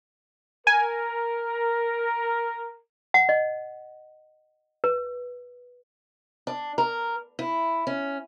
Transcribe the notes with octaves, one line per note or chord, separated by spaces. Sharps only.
A#4 G#5
F#5
D#5
B4
D4
A#4
E4
C#4